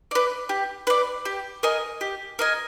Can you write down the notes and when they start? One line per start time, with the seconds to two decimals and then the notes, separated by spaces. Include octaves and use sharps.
0.11 B4 D5
0.49 G4
0.87 B4 D5
1.25 G4
1.63 A#4 D#5 G#5
2.01 G4
2.39 A#4 D#5 G#5